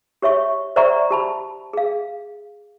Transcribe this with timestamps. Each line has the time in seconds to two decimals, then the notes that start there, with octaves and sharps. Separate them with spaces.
0.22 G4 C#5 E5 C#6
0.76 C5 D5 E5 F#5 A#5 C#6
1.11 G4 A5 B5
1.73 G#4 F5